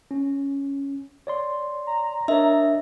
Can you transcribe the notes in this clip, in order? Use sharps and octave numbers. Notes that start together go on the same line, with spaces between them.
C#4
C#5 D5 C6
A#5
D4 A#4 C#5 D#5 E5